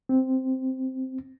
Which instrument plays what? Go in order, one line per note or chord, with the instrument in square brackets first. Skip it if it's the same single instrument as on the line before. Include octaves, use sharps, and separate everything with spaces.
[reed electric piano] C4